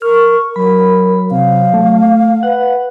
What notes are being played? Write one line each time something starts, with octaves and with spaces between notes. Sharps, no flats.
A#4 C#6 F6
F#3 A#4 B5
C3 F5
A3
B4 F#5